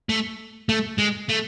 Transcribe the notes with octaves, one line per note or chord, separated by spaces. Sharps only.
A3
A3
G#3
A3